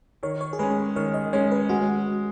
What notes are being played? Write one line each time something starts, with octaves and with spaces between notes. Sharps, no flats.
D#3 C#5
C#5
G#4
G#3 C#4 B4
D#3 C#5
D#5
G#3 C#4 C#5
B4
G#3 F#4